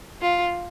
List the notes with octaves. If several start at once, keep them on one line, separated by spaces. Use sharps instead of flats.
F4